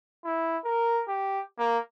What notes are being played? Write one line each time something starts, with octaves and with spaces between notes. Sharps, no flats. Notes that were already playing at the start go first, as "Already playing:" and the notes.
E4
A#4
G4
A#3